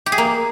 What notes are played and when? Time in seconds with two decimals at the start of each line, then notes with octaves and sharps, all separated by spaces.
0.06 G4
0.12 G#4
0.18 A#3